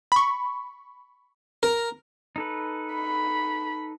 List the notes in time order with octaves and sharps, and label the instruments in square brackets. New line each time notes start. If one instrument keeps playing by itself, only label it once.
[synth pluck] B5 C#6
[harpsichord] A#4
[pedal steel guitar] D#4 A4 B4
[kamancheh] B5